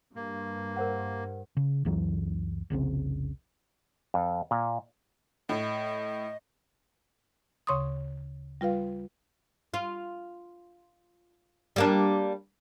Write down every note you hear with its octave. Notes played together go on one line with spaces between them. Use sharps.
G2 A#3
A#4 C5 F#5
C#3
C#2 F#2 E3 F#3
F1 C2 C#3 C4
F2
A#2
A2 D#5
D2 C#3 C#5 C6 C#6 D#6
G3 F4 B4 F5
F4
G3 A#3 D4